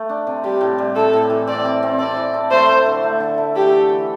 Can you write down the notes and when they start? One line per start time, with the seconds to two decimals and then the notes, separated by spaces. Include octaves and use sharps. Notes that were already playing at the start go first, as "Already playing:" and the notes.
Already playing: A3
0.09 D4
0.27 C3
0.44 G3 G4
0.61 A2
0.78 G3
0.95 A2 A4
1.13 A2
1.30 E3
1.47 C4 D5
1.65 C4
1.83 C4
1.99 A4 D5
2.17 E3
2.34 A4
2.51 A3 C5
2.69 A3
2.86 D3
3.03 A3
3.20 D3
3.38 E4
3.55 E3 G4
3.72 A4
3.89 E3